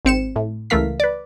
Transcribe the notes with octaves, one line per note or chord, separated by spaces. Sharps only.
G#1 C4 C#7 E7
A2
C#2 E3 A3 A#4 F5 B6
B4 D5